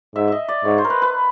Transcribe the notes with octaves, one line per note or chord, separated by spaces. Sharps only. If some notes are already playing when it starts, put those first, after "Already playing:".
G#2 E5
D#5 E5
D5
G#2 C#5
C5
A#4
B4
B4